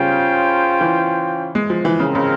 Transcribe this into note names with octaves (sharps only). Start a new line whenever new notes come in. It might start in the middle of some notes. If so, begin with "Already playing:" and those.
Already playing: C#3 G3 C#4 F4 C5 G5
E3
G#3
F3
E3
C#3 G#3 C4 F4 A#4
C#3